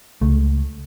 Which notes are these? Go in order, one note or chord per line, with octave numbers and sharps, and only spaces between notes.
C#2 A3